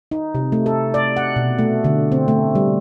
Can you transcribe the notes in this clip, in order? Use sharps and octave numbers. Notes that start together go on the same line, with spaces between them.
D#4
C3
A3
A4
D5
F#5
B2
A3
D3
C4
A3
G3